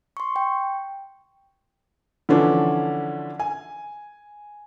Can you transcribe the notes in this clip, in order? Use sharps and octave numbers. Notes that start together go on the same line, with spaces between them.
C6 C#6
G5
D3 E3 F3 C#4 D4
G#5